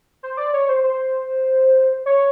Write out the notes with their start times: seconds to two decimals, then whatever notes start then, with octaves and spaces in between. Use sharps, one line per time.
0.23 C5
0.37 D5
0.53 C#5
0.69 C5
0.84 C5
2.06 C#5